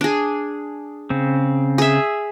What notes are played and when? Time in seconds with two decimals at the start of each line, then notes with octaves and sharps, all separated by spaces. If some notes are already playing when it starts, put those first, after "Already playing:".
0.01 D4 G#4
1.10 C#3 C4
1.78 G#4 E5